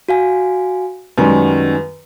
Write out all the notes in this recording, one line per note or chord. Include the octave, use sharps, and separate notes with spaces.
F#4 F5 G#5
F#2 D#3 G3 G#3 B3 C#4 B4